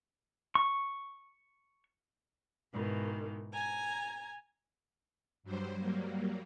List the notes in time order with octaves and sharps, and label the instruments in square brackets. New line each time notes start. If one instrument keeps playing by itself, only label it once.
[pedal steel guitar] C#6
[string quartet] G#2 B2 D#3 E3
G#5 A#5 G#6
[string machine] G2 F#3 G3 C5
F#3 G3 A#3